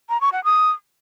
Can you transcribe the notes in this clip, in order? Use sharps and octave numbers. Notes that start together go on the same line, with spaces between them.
A#5
C#6
F#5
D#6